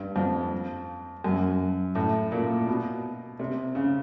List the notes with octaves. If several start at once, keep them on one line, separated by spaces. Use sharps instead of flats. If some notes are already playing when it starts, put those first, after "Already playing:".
Already playing: G2
F2
F#2
A2
A#2
B2
C3
C#3